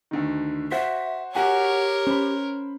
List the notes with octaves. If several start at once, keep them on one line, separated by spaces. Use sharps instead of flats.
D2 D3 D#3
F#4 C5 E5
F#4 G4 A#4 C#5 F#5 G#5
C#4 C5 B5